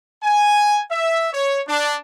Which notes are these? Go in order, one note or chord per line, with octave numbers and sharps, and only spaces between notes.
G#5
E5
C#5
D4